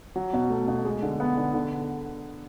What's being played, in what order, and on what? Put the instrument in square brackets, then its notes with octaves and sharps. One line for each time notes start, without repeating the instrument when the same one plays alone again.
[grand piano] F#3
B2
A3
B2
G#3
D3
B3
D3
D3